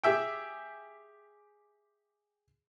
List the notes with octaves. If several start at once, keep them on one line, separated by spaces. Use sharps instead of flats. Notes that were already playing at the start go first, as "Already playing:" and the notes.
G4 G#4 E5 G5